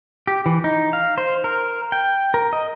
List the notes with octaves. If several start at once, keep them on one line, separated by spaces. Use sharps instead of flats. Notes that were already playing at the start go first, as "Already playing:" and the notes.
G4
E3
D#4
F5
C5
A#4
G5
A#4
D#5